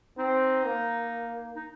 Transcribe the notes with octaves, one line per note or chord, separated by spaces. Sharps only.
C4 D#4
A#3
D#4